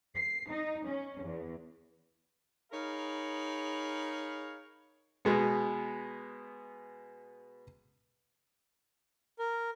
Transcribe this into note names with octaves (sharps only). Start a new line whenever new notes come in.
C7
D#4
C#4
E2
D#4 G#4 A#4 C#5 F5 B5
B2 G#3 B3
A#4